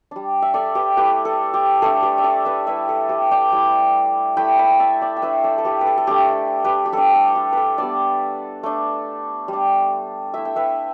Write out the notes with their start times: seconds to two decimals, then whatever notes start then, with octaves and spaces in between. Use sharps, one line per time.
0.11 G3 D4
0.42 E5
0.54 A4 D5
0.75 G4 B4
0.97 A3 E4 G4 B4
1.25 A4
1.54 G4
1.82 A3 D4 A4
2.03 G4 B4
2.18 E5
2.24 A4 D5
2.45 B4 E5
2.66 G3 E4 B4 E5
2.89 A4
3.09 G4 B4
3.31 D5 G5
3.52 G3 E4
4.37 A3 E4 G5 B5
4.58 G5 B5
4.71 B5
4.80 E5 A5
5.02 D5 G5
5.16 G5
5.22 A3 D4 B4 E5
5.44 A4 D5
5.58 A4
5.65 G4 B4
5.81 B4
5.87 A4
5.98 A4
6.07 A3 D4 G4
6.64 G4 B4
6.86 G4
6.93 G3 D4 A4
7.14 A4
7.35 G4
7.53 A4 B4
7.78 G3 B3 D4 A4 D5
8.63 A3 D4
9.48 G3 D4
10.34 A3 E4 E5
10.45 G5
10.56 B4 E5